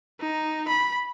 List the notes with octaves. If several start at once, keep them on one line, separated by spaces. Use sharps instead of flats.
D#4
B5